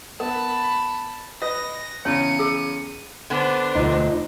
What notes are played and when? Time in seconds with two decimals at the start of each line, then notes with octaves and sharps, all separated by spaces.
0.20 B3 A#4 A5 B5
1.42 B4 D#5 A#6
2.05 E2 C#3 C#5 C#7 D#7
2.39 G#4 E6
3.30 D3 B3 D4 C5
3.75 E1 D2 F3 D#4